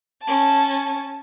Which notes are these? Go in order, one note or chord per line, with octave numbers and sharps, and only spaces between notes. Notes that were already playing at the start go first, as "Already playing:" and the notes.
C#4 A5